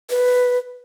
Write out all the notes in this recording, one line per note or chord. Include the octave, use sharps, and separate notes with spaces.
B4